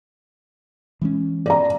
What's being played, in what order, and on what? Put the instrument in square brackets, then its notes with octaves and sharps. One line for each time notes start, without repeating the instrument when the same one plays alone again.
[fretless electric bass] E3 G#3 C#4
[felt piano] D5 A#5